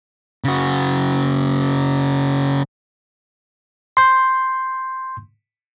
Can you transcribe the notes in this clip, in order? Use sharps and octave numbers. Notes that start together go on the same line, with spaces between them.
C#3 F#4
C6 G6